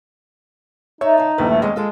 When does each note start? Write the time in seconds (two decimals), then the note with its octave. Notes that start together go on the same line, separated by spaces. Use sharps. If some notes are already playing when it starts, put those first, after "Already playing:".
1.01 D#4 C#5 E5
1.18 C#3 A5
1.38 D#1 A#1 E4 B4
1.50 A3
1.62 E2 G#3 C#4 D5 D#5
1.76 G#3 F4 A4